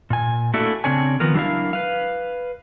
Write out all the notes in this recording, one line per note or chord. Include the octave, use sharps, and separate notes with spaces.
A#2 G#5
A3 A#3 D4 E4 F#4 A4
C#3 F3 C4 D4 C#5 G#5
D#3 F3 B3 A#4
F#3 D4 E4 A#4 F5
B4 F5